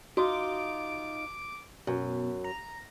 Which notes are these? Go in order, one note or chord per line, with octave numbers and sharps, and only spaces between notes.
D#4 F4 F#4 D6
F#2 B2
A#5